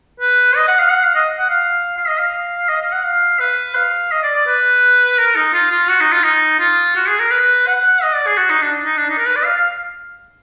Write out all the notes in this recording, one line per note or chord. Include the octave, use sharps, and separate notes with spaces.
B4
D#5
F#5
F5
F#5
F5
D#5
F#5
F5
F5
D#5
F5
D#5
F5
F#5
F5
B4
F5
D#5
D5
D5
B4
A#4
D#4
F4
F4
F#4
D#4
F4
D#4
F4
F#4
G#4
A#4
B4
F#5
D#5
D5
G#4
F#4
D#4
D4
D#4
D4
D#4
A#4
B4
D5
F5
F5